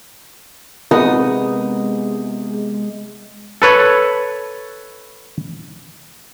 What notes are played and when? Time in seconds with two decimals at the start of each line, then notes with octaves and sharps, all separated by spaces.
0.91 C3 G#3 B3 D#4 D#6
3.62 A4 B4 C#5